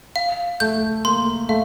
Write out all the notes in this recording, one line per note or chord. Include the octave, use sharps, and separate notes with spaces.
F5
A3 G6
A#3 C6
A3 F5